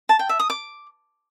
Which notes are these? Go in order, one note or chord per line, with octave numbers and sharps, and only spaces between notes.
A5
G5
E5
D#6
D6